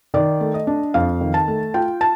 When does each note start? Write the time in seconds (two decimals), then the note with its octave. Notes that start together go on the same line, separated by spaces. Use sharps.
0.14 D#3 D5
0.41 A3
0.54 D#5
0.67 D4
0.94 F2 F5
1.21 D#3
1.34 A5
1.48 A3
1.74 F4 G5
2.01 A5